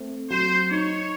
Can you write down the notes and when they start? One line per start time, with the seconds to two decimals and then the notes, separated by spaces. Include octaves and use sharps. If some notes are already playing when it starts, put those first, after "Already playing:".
Already playing: A3 C4
0.30 F#3 C5
0.71 D#4 C#5